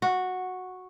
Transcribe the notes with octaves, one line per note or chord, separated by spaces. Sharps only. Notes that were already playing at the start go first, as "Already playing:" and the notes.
F#4